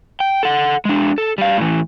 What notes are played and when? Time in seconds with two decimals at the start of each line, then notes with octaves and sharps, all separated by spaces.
0.20 G5
0.43 A4 F#5
0.85 G#3 D4
1.18 A4
1.38 G3 F5
1.57 A2 E3